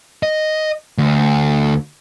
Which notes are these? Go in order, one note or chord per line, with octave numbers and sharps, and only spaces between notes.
D#5
D2